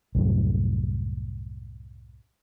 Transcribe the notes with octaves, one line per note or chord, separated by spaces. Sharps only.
C2 F#2 A2